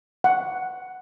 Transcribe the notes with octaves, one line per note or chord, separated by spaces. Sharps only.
F#5